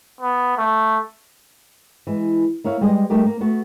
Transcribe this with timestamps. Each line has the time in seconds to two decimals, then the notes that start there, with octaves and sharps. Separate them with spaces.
0.21 B3
0.58 A3
2.07 E3 G#3
2.64 A#3 E4 C#5 F5
2.81 G3 G#3 G#4 B4 D#5
3.10 G3 A3 D#4 G4 A#4
3.25 A#3
3.40 A3 B3 F#4